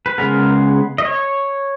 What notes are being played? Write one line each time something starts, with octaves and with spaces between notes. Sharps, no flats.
B4
C#3 G#3 B3 A#4
D#5
C#5